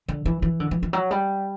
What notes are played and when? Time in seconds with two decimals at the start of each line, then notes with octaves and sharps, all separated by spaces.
0.08 D3
0.26 E3
0.42 E3
0.60 D3
0.71 E3
0.83 E3
0.93 F#3
1.11 G3